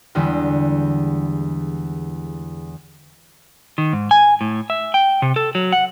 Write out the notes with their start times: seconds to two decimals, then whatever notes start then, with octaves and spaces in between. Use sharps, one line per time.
0.15 E2 D3 G3 G#3
3.78 D#3
3.93 G#2
4.11 G#5
4.41 A2
4.70 E5
4.94 G5
5.22 C3
5.36 A4
5.55 F#3
5.72 F#5